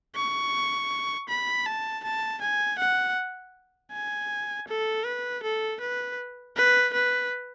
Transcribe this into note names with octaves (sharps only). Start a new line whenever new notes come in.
C#6
B5
A5
A5
G#5
F#5
G#5
A4
B4
A4
B4
B4
B4